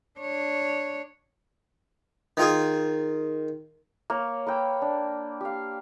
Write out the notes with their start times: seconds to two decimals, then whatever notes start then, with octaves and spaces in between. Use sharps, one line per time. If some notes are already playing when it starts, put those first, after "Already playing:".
0.20 D4 C#5
2.37 D#3 F4 G#4
4.10 A#3 C#5
4.46 A#3 B4 G5 E6
4.82 D4
5.41 G4 F5